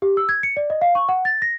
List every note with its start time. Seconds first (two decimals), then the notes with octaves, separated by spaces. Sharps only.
0.02 G4
0.17 E6
0.29 G#6
0.43 C#7
0.57 D5
0.70 D#5
0.81 F5
0.95 C#6
1.09 F#5
1.25 A6
1.42 A#6